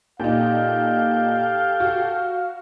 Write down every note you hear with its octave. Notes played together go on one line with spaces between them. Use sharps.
A#2 D#4 G4 A4 F5 G5
F#4